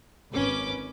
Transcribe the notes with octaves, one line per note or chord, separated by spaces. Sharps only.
G#1 C#4 B4 D6